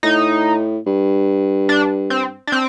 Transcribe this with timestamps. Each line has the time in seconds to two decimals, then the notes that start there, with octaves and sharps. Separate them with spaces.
0.03 A2 D#4
0.86 G2
1.69 D4
2.10 C4
2.47 D4
2.52 C4